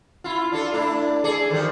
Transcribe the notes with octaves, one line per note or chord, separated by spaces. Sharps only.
E4 F4
D4 F4 A4
A3 D4 E4
G#4 A4 D5
D#3 F3 G3